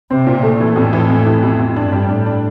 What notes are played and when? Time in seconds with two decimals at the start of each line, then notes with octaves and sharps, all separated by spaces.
0.11 C3 C4
0.27 A#2
0.43 A#2 A3
0.60 E3
0.76 F2 A2
0.93 E3
1.10 F2
1.26 E3
1.43 F2
1.59 F2
1.76 G2 D4
1.92 G3
2.09 A2 D4
2.26 D4